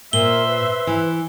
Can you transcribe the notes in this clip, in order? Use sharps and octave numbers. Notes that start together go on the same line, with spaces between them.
A#2 A#4 C5 E5 G7
B4
E3